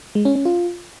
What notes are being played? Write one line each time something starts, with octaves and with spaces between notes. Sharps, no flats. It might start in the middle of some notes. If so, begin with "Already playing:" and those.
G#3
C#4
C#4
F4